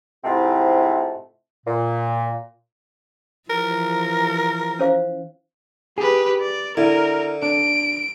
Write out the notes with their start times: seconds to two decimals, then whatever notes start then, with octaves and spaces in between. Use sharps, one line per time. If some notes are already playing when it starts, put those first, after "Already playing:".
0.24 G#2 C3 A3 C4 E4 F4
1.66 A#2
3.50 E3 F3 A#4
4.79 C#4 C5 F5
5.98 G4 G#4 B4
6.41 D5
6.77 D3 E4 A#4
7.42 D4 D7